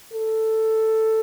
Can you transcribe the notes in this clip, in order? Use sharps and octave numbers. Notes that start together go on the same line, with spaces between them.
A4